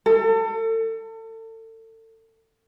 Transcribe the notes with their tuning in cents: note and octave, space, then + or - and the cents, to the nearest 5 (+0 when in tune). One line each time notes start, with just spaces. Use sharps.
A4 +35